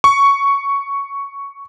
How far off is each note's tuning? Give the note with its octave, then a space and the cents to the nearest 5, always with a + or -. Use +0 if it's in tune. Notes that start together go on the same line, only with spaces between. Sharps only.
C#6 +5